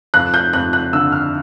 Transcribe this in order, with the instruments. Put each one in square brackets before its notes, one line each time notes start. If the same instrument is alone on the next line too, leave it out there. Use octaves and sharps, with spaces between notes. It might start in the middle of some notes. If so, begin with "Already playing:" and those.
[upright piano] F2 F#6
G6
F2 F#6
F#6
D3 E6
F6